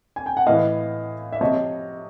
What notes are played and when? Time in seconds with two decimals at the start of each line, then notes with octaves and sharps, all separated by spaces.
0.16 G#5
0.26 G5
0.37 F#5
0.46 A2 E3 D#5 F5
1.32 E5
1.41 C3 F3 C#5 D#5